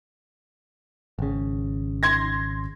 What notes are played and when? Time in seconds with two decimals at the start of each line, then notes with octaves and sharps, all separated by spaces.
1.19 G#1 C#3
2.03 C6 G#6 A#6